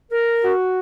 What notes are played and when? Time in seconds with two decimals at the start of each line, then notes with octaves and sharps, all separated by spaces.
0.11 A#4
0.43 F#4